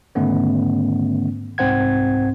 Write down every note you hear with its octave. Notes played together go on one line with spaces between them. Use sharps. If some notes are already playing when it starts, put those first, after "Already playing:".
G#2 D3 D#3 A3 B3 C#4
C2 G#2 C4 C5 F#5 G#6